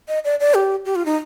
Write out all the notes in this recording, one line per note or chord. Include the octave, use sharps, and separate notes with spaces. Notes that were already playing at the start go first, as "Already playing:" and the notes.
D#5
D5
D5
G4
G4
F4
D#4